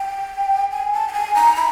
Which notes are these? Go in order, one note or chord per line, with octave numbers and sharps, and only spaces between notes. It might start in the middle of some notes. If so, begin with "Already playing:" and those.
Already playing: G5
G#5
A5
G5
G#5
A#5
B5